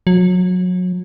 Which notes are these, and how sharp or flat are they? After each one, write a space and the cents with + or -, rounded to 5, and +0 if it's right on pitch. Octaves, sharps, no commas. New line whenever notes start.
F#3 -30